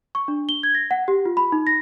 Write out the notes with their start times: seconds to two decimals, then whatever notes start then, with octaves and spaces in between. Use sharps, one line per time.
0.15 C#6
0.28 D4
0.49 G7
0.63 G#6
0.75 A#6
0.91 F#5
1.08 G4
1.26 F4
1.37 B5
1.52 D#4
1.67 A#6